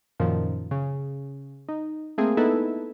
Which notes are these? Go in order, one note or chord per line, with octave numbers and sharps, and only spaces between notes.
F#2 A#2 D#3 F3
C#3
D#4
A3 A#3 C4 G#4
B3 D#4 E4 A4 B4